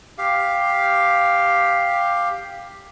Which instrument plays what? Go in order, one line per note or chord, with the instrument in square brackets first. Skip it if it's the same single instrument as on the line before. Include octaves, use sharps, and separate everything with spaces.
[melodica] G4 F5